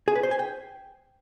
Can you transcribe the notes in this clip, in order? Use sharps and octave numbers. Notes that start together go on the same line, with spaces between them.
G#4
B4
C5
G#5
G5